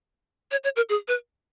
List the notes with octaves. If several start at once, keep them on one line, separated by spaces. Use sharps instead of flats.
C#5
C#5
A#4
G#4
B4